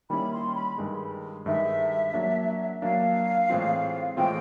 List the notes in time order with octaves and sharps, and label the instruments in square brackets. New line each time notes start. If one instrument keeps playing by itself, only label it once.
[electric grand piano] D#3 G3 A#3 C#4 E4 [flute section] B5
[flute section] C6
B5
[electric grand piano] G2 D#3 G#3
[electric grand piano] G2 D#3 G#3 [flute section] E5
[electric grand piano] F#3 A#3 D4
[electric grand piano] F#3 A#3 D4 [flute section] F5
[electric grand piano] A2 E3 G#3 C4 F4
[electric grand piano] A2 E3 G#3 C4 F4 [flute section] G5